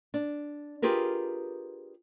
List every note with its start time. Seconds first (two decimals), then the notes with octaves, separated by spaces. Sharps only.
0.14 D4
0.82 F4 G4 G#4 A#4 B4